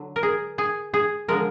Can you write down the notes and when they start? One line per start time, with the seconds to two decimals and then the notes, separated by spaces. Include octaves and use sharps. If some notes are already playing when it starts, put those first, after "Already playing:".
Already playing: D3 F#3
0.16 A#4
0.23 G#4
0.58 G#4
0.94 G#4
1.28 D3 F3 G#3 A#4